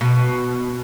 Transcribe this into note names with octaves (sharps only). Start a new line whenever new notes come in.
B2